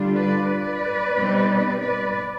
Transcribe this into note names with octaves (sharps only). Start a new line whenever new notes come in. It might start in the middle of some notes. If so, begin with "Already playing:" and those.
Already playing: D3 G3 D4 F4
B4 D5
B4 D5
B2 G3 C4 D#4
B4 D5